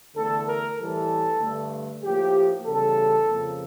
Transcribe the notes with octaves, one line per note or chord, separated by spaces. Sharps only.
E2 D3 A3 A4
A#4
A2 E3 G3 A4
G2 D3 A3
A2 F3 A#3 G4
E2 C#3 G3 A4
F2 C#3 F3 A#3